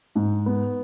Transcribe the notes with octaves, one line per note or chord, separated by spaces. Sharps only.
G#2
B3